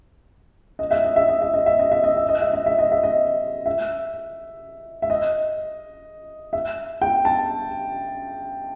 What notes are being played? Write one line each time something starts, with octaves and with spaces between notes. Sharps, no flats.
D#5
E5
D#5
E5
D#5
E5
D#5
E5
D#5
E5
D#5
E5
D#5
E5
D#5
E5
D#5
E5
D#5
E5
E5
D#5
E5
G5
A5